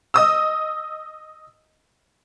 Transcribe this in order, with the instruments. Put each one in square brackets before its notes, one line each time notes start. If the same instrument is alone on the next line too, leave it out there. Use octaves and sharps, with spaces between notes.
[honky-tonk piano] D#5 D#6 E6